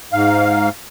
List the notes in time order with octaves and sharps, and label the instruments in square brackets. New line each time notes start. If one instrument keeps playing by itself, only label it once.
[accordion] G#2 F5